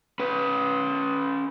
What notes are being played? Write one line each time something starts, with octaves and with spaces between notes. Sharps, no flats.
C#4 B4